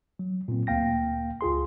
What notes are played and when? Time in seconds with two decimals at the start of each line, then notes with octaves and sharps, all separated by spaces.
0.19 F#3
0.48 A#2 C4
0.67 D2 A#3 F5 G5 A#6
1.41 C#2 F4 G#4 C6